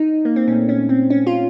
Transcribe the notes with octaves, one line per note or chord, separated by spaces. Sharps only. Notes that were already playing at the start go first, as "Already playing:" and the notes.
Already playing: D#4
A#3
C4
A#2 A3 C#4
C#4
C4
C#4
F4